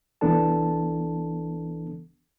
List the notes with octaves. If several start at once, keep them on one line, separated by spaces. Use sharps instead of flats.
C2 E3 B3 D4 A4 A5